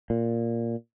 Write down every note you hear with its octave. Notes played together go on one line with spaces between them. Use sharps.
A#2